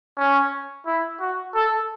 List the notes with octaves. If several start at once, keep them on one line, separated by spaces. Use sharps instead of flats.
C#4
E4
F#4
A4